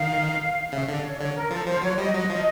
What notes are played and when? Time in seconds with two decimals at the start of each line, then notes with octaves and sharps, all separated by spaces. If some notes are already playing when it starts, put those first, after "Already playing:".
Already playing: D#3 F5
0.72 C#3 E5
0.88 D3 D5
1.03 C#5
1.19 D3 C#5
1.35 A#4
1.51 F3 A4
1.66 F3 C5
1.82 F#3 C#5
1.98 G3 D#5
2.14 F#3
2.30 F3